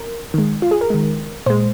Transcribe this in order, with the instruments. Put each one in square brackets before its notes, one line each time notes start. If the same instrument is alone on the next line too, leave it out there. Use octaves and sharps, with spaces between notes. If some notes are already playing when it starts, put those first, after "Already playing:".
Already playing: [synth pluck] A#4
D#3 G#3
F4
G#4
A#4
D#3 G#3
A#2 G#3 C5